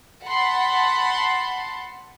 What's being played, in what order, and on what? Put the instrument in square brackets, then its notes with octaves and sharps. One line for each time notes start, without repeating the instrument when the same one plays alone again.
[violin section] F#5 A5 B5 C6